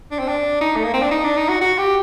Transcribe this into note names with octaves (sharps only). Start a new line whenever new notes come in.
D4
C4
D4
D#4
A3
A#3
C4
D4
D#4
D4
D#4
F#4
F#4
G4